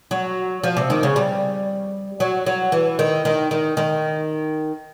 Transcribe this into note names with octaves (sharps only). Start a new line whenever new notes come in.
F#3
F3
C3
D#3
C#3
G3
F#3
F#3
E3
D#3
D#3
D#3
D#3